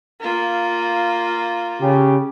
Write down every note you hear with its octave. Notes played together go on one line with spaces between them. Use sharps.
A#3 F4
C#3 G4